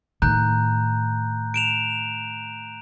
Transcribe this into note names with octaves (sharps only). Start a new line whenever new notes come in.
A2 D#3 A#5 F#6 G6
D7 E7 F7